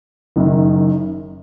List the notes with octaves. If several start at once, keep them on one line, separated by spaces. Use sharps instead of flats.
F#1 F#2 D#3